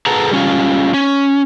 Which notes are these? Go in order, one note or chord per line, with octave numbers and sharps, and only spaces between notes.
G#4 A4 B4 F#5 A5 A#5
G3 C#4 F4
C#4